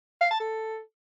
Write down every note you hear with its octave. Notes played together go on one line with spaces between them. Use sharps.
F5
A5
A4